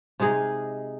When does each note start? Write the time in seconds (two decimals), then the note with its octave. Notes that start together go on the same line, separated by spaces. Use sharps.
0.20 C3 G#3 D#4 G#4